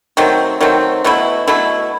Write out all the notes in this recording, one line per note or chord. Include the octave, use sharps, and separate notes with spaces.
D#3 F#3 A3 C4
D#3 F#3 A3 C4
B2 F#3 A3 E4
B2 F#3 A3 E4